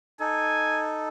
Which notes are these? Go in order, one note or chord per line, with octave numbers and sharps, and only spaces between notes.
D#4 A4 G#5